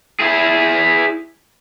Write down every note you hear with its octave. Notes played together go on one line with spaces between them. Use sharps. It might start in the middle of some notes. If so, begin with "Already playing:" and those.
E4 G#4